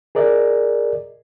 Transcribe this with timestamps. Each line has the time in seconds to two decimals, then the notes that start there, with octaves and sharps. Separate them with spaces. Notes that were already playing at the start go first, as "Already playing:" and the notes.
0.15 G#4 A#4 D5 D#5